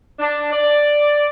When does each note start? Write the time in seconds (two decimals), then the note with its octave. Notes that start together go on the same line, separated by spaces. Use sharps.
0.18 D4
0.50 D5